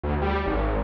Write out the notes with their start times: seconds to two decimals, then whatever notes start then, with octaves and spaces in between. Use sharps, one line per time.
0.03 D2
0.22 G3
0.46 G#1